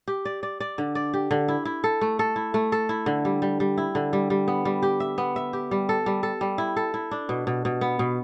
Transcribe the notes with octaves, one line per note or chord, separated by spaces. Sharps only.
G4
D5
D5
D5
D3
D5
G4
D3
E4
E4
A4
A3
A4
E4
A3
A4
E4
D3
G3
G3
G3
E4
D3
G3
G3
B3
G3
G4
E5
B3
E5
G4
G3
A4
G3
A4
G3
E4
A4
E4
D4
B2
B2
B2
B3
B2